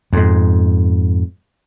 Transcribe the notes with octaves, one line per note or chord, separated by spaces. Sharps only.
F2 G#2